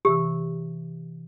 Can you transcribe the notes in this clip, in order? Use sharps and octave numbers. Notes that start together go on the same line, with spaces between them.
C3 E3 G4 E6